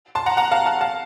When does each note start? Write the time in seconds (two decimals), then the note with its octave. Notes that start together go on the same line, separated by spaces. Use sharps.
0.15 A5 C6
0.26 F#5 A#5
0.37 F#5 A#5
0.51 F5 A5
0.66 F5 A5
0.81 F5 A5